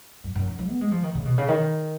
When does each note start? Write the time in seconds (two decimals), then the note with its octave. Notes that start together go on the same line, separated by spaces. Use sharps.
0.24 F#2
0.35 F#2
0.47 F3
0.59 F3
0.69 B3
0.81 G#3
0.92 F3
1.03 D#3
1.15 C#3
1.26 B2
1.38 C#3
1.48 D#3